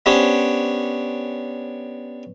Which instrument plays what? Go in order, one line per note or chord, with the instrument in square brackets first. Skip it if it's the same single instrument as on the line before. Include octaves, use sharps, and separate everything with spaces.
[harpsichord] B3 C#4 D4 G4 C5 C#5